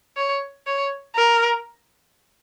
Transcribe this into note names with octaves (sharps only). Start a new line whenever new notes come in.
C#5
C#5
A#4